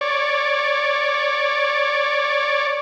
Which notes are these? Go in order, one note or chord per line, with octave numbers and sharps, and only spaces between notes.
C#5 D5